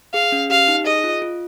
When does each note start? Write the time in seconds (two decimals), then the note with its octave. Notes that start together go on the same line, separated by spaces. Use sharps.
0.14 G#4 F5
0.32 C#4
0.50 G4 F5
0.68 D#4
0.86 G#4 D#5
1.04 F4
1.22 F4